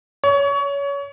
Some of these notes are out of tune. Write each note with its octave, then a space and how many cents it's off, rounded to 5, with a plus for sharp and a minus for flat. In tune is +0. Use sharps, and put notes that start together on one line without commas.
C#5 +25